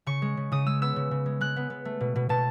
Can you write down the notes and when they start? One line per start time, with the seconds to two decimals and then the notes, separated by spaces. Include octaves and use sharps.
0.06 C#3 C#6
0.22 G#3
0.37 C#3
0.52 C#3 D#6
0.66 G#3 E6
0.81 B3 E6
0.96 C#3
1.11 C#3
1.26 G#3
1.41 G#3 F#6
1.56 B3
1.70 B3
1.85 A3
2.00 B2
2.16 B2
2.29 B2 A5